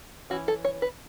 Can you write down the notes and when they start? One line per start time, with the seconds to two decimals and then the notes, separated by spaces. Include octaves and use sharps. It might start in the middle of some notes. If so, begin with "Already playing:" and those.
0.30 E3 C#4 F#4
0.48 A4
0.65 C#5
0.82 B4